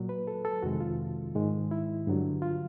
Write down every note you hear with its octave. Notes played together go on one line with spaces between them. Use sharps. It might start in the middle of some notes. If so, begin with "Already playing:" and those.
Already playing: A#2 F#3
B4
A4
A4
F2 C3 D#3 G#3 F#4
F4
G#2 D#3 G#3
E4
G2 D3 F#3
F4